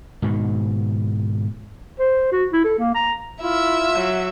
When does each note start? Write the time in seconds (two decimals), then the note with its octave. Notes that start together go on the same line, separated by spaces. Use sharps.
0.22 G#2 B2 D#3
1.99 C5
2.32 F#4
2.53 E4
2.64 A4
2.79 A#3
2.95 A#5
3.41 E4 F4 E5
3.93 F#3